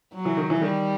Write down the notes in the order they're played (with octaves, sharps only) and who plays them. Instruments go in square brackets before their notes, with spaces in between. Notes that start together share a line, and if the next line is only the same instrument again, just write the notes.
[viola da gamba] F#3
[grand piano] E3
D#3
E3
[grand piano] D#3 [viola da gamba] G3